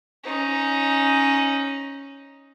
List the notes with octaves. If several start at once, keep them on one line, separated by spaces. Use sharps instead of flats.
C#4 D#4